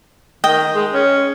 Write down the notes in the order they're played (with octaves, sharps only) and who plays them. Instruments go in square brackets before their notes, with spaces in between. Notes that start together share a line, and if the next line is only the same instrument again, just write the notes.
[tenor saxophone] D#3 [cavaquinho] D#5 G5
[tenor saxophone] G#3
C#4